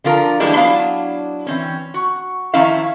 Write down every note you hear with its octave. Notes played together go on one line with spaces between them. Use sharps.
D3 F3 F4 A#4
E3 G3 G#3 A#3 D4 E4
F#3 B3 D4 E4 F5
E3 C4 C#4
F#4
D#3 F3 C#4 E4 E5 F5